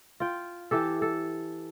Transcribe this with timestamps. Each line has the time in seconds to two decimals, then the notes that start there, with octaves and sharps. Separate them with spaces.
0.20 F4 G5
0.71 E3 G4 A4
1.02 A4